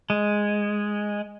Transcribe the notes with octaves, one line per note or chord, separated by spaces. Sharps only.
G#3